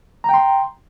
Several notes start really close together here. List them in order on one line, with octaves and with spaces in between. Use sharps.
A#5 G5 C6